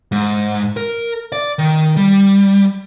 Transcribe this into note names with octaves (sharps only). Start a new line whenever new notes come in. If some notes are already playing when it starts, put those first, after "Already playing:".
G#2
A#4
D5
D#3
G3